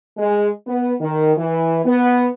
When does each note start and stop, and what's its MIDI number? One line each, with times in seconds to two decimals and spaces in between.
0.18 0.48 56
0.67 0.94 59
1.01 1.33 51
1.38 1.82 52
1.85 2.27 59